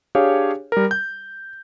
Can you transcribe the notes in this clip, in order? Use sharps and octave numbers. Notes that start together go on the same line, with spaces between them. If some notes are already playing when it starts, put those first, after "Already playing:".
D4 G4 G#4 C#5 F5
G3 A#4
G6